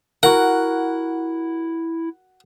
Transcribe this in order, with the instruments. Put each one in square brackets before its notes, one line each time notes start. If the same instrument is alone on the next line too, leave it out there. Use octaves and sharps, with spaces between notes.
[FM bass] E4 [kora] F#4 A#4 [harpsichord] F#5